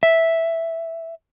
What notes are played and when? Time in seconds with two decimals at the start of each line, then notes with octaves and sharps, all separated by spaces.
0.03 E5